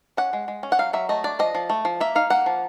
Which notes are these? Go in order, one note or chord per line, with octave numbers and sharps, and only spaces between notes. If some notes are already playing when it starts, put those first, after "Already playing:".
C#4 F#5
G#3
G#3
C#4
F#5
F#3 F5
F#3 E5
A3 D#5
D4 D5
F3 D#5
F3
A3
F3
A#3 E5
D#4 F5
A#3 F#5
F3